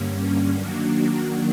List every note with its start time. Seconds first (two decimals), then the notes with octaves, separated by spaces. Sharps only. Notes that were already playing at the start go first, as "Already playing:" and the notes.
Already playing: G2 D3 G3 A#3 C#4
0.55 D#3 F#3 A#3 D4 F#4